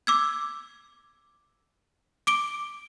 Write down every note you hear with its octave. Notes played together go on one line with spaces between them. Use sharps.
D6 E6 G#6
D6 D7 G7